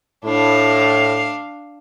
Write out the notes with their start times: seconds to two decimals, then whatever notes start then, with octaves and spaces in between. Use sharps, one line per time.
0.25 A2 D4 F5